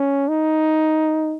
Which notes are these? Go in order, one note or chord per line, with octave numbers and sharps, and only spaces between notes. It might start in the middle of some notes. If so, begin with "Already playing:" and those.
Already playing: C#4
D#4